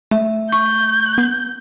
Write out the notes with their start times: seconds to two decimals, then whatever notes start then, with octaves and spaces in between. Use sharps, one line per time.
0.11 A3 E5
0.52 C#6 G6
1.18 B3